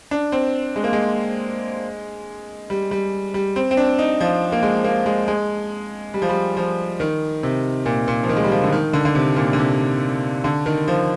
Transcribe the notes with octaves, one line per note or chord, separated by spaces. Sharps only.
D4
C4
G#3
A#3
G#3
G3
G3
G3
C4
C4
D4
D#4
F3
A#3
G#3
A#3
G#3
G#3
G3
F3
G3
F3
D#3
C3
A#2
A#2
F3
D#3
G#3
G3
F3
D3
D#3
D3
D3
C3
A#2
D3
C3
D3
D#3
F3